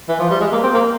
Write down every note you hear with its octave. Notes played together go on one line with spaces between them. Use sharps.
E3
F3
G3
G#3
A#3
C4
A#3